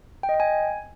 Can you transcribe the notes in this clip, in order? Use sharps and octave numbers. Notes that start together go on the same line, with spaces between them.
G5
D#5
G5
G#5